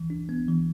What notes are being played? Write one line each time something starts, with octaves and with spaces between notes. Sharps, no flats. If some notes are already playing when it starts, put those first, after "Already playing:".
Already playing: E3
D4
B3
E3